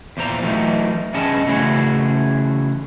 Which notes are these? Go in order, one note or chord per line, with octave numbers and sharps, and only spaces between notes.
E2 A#2 C5 A#5
E3 F#3 A3 D#4
G2 B3 C#4 G#4 D#5 A5
C#3 E3 A3 C#4 F#4 G#4